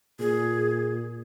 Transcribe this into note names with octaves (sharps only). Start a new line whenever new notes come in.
A#2 G#4